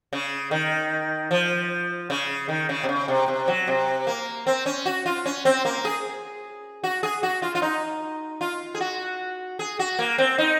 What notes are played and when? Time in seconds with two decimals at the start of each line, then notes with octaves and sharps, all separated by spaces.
0.13 C#3
0.51 D#3
1.31 F3
2.10 C#3
2.48 D#3
2.69 C#3
2.83 C3
2.89 C#3
3.08 C3
3.28 C3
3.48 F#3
3.67 C3
4.07 A#3
4.47 C4
4.66 C#4
4.86 F#4
5.06 F4
5.26 C#4
5.45 C4
5.65 A#3
5.85 G#4
6.84 F#4
7.03 G#4
7.23 F#4
7.42 F4
7.55 F4
7.62 D#4
8.41 F4
8.75 G#4
8.81 F#4
9.59 G#4
9.79 F#4
9.99 A#3
10.18 C4
10.38 D#4